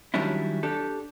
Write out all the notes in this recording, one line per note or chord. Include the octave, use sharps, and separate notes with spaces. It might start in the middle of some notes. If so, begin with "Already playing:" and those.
D#3 F#3 G3 C#4 D4 E4
D4 G4 A4